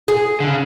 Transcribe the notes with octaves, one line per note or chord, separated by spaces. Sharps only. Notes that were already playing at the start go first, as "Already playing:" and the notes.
G#4
D3
C#3